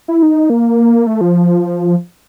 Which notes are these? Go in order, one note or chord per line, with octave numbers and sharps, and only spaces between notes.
E4
D#4
A#3
A3
F3